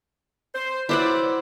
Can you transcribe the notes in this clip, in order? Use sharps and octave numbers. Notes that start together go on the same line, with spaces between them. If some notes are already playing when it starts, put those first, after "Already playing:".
C5
F#3 E4 B4 C5 D5 F#5